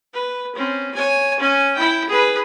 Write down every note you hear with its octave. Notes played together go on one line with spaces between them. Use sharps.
B4
C4 C#4
C#5 G#5
C#4 G#5
E4 G5
G#4 B4